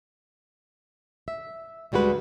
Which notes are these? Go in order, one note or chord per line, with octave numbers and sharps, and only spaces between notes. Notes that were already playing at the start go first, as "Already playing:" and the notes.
E5
D2 G3 G#3 F#4 B4